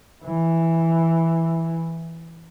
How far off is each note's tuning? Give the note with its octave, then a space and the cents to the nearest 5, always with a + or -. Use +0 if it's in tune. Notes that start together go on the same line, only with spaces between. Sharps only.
E3 +0 E4 +0